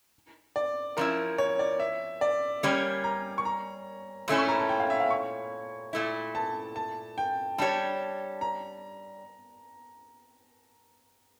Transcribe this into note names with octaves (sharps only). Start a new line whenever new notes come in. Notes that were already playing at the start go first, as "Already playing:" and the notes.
D5
F3 C#4 E4 A#4
C#5
D5
E5
D5
G3 A#3 C#4 G4 C#5
A#5
C#6
A#5
A#2 A3 C#4 E4
C#6
A#5
A5
G5
F5
E5
F5
C#6
A#2 A3 E4
A5
A5
G5
G3 D4 G4 C#5 A5
A#5